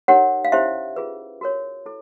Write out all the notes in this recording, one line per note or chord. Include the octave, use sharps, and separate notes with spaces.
D#4 G4 A#4 C#5 F#5
F5
C#4 E4 G4 C5 E5
F4 G#4 B4
F#4 A#4 C#5
E4 A4